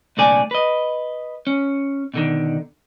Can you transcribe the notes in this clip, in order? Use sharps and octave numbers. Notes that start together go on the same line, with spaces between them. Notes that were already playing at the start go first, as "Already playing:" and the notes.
C2 A#2 D3 A3 D5 G#5
B4 D#5
C#4
B2 D3 D#3